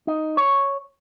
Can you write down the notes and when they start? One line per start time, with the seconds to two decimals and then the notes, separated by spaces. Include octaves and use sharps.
0.07 D#4
0.37 C#5